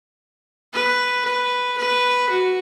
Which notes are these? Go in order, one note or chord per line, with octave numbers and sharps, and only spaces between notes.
B4
B4
B4
F#4